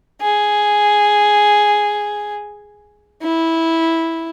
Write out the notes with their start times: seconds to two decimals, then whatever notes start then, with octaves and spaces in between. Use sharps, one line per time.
0.21 G#4
3.23 E4